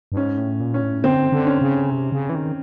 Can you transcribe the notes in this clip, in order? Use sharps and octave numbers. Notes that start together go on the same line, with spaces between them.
G2
G#2 C#4
A2
A#2
C#4
A2
D3 C4
D3
C#4
C#3
C3
C#3
E3
D#3